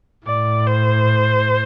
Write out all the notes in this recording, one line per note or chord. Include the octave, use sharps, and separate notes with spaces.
A2 D5
C5